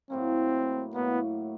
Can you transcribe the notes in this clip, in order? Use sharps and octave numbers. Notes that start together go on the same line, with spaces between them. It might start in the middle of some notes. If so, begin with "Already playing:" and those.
A2 F#3 A#3 C4
A2 F#3 A#3 B3